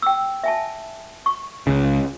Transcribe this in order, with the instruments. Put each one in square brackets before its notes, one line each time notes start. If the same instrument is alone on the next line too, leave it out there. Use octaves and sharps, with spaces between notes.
[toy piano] G5 E6
E5 G#5 A5
C#6
[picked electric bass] C#2 C#3